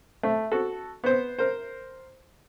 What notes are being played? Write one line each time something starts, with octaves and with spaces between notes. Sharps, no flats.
A3
F#4 A4
B3 C5
A#4 C5